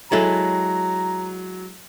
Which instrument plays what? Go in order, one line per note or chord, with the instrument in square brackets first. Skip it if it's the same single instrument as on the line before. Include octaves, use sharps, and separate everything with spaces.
[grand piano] F#3 [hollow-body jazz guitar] G#3 E4 A4 [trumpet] A#5